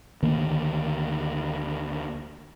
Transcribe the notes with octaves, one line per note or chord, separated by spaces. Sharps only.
D2 D#3 A#3